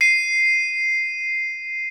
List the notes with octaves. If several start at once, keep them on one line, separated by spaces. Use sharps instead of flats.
C7 D#7